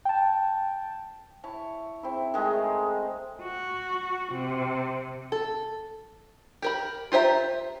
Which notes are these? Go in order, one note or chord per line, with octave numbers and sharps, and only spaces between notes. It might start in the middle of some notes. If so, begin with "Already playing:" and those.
G5 A5
E4 C#5 A5
C4 E4
D#3 G#3 A3 D#4
F#4
C3
A4
G4 A#4 B5
F4 G4 C5 E5 A#5